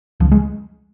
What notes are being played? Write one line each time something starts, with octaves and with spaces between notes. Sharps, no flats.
C#2 F3
G#3